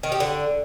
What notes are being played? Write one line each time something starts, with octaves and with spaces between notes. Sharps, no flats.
D#3
G4
D3